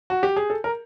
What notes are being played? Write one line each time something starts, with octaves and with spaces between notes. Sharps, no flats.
F#4
G4
G#4
A4
A#4